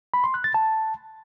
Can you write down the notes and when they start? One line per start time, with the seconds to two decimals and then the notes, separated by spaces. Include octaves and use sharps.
0.14 B5
0.24 C6
0.34 F#6
0.44 A6
0.54 A5